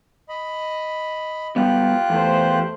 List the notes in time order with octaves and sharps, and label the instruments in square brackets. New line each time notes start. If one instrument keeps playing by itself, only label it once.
[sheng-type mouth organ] D#5 B5
[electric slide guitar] F#3 G3 B3 [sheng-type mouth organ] F4 G4 F#6
[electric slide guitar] E2 [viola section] A3 C5